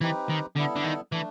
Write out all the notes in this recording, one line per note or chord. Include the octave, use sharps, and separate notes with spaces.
E3 C4 D#4 G4 B4
D#3
D3 G3 B3 E4 A4
D3
D#3
E3 A3 D4